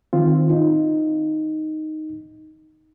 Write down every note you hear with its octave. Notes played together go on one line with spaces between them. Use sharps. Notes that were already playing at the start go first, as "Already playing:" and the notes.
D#3 C4 F4
D#4